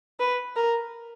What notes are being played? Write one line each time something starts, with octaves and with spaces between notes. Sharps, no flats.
B4
A#4